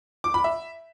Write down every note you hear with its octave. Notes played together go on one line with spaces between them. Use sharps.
D6
B5
E5